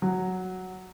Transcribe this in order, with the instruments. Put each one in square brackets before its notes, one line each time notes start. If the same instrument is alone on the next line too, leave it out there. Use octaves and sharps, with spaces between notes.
[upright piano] F#3